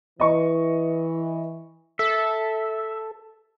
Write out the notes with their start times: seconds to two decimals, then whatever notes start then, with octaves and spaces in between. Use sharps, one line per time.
0.20 E3 D#5 C#6
1.99 A4 E5